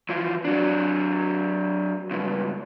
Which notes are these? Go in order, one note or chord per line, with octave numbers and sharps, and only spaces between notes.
E3 F3
F#3 D4
C#2 G2